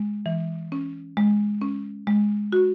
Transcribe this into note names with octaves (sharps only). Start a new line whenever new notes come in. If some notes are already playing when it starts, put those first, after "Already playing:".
Already playing: G#3
E3
C#4
G#3
C#4
G#3
F#4